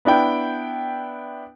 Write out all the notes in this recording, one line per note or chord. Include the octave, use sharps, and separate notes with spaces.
B3 D4 E4 G5